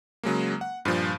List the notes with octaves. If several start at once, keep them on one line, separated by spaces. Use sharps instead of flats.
C#3 F#3 G#3 A#3
F#5
G2 A#2 F3